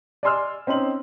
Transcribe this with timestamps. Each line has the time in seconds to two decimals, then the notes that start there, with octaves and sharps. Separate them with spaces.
0.23 D5 D#5 G#5 C6 E6 F6
0.67 C4 C#4 D#4 C6 F#7